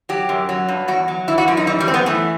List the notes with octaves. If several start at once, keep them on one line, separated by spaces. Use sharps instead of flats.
F#3 G4
F#2
F#3
G2
E2 F#4
F#3
E3 E4
F#4
F#2 E4
D#4
E3 G3
G3
F#2 C4
B3
E3 A3